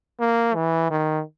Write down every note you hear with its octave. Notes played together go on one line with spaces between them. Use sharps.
A#3
E3
D#3